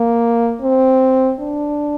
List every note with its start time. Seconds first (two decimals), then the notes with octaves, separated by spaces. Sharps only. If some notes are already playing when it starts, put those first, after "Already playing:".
Already playing: A#3
0.62 C4
1.40 D4